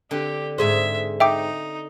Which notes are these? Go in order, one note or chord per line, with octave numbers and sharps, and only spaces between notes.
D3 C4 G4
G#2 G#4 C5 E5
D#4 E5 G5 D6